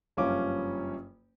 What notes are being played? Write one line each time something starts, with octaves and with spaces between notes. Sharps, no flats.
F#1 G2 F3 C#4 F5 D6